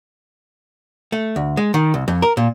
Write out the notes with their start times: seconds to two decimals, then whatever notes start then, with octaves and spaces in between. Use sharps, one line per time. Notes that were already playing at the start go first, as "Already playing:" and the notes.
1.12 A3
1.36 D2
1.57 G#3
1.74 D#3
1.94 C2
2.08 F2
2.22 A#4
2.37 A#2